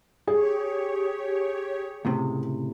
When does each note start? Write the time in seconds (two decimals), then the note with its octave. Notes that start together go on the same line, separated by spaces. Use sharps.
0.27 G4 G#4 C#5
2.05 C#2 A2 C3